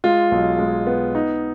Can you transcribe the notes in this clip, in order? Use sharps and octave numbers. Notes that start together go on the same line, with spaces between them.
G#3 F4
B1
G#3
B3
D#4